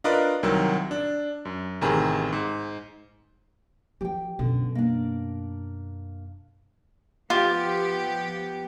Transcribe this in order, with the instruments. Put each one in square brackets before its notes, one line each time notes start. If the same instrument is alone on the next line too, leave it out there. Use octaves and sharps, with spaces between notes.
[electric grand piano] D4 F4 A#4 B4 D5 D#5
C2 D#3 F#3 A#4 E6
D4
F#2
A1 C3 D#3 G#4 A#5 B5
G#2
[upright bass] E3 F3 [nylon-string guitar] G4 G5
[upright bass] F#2 B2 [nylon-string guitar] D3
[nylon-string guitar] A#3 D4
[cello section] F3 B3 G4 [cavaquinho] F4